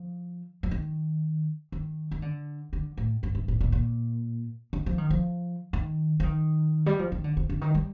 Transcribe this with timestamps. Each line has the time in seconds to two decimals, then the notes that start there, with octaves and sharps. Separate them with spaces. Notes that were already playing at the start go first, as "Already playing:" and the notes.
Already playing: F3
0.63 F3
0.71 D#3
1.72 D#3
2.11 D#3
2.22 D3
2.73 D3
2.97 A2
3.23 G2
3.35 G2
3.48 A2
3.60 A#2
3.72 A#2
4.73 D3
4.86 F3
4.98 D#3
5.10 F3
5.73 D#3
6.20 F3
6.23 D#3
6.86 G3
6.99 F3
7.12 D#3
7.24 D3
7.37 C3
7.49 D3
7.61 D#3
7.75 G3